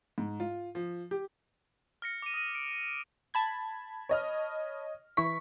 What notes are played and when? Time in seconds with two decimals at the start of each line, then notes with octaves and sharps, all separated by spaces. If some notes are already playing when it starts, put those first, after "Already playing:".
0.18 G#2
0.40 F4
0.75 F3
1.11 G4
2.02 F6 A#6 C#7
2.22 D6 D#7
2.34 D#6 D#7
2.55 D7
3.34 A5 B5 G#6
4.09 C#5 D#5 F6
5.17 E3 E4 C#6 B6